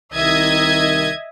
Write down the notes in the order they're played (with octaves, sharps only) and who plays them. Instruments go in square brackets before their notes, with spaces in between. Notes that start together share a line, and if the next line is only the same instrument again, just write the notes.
[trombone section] C2 D#3 [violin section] D#5 E5 G#6